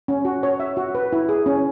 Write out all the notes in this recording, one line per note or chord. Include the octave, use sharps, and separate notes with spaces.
C#4
F#4
C#5
E5
F#4
B4
E4
G#4
C#4